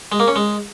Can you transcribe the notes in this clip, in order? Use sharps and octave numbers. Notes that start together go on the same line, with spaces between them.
G#3
A#3
C#4
G#3